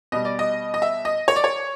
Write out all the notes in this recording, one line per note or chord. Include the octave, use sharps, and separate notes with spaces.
B2 G3 D#5
D5
D#5
D#5
E5
D#5
C#5
D5
C#5